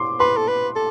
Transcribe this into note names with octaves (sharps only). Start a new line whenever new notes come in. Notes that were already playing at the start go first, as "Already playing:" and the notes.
Already playing: C6 D6
B4 C6
A4
B4
A4